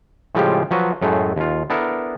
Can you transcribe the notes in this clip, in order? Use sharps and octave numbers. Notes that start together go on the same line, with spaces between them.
A2 C#3 F3 G3 G#3 G4
F3 F#3 F#4 B4
F#2 A2 G#3 A3
D#2 F4
B3 D4 E4 A4 A#4